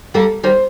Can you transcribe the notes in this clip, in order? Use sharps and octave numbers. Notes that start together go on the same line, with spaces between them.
G3 A#3 A4
D#3 G3 C5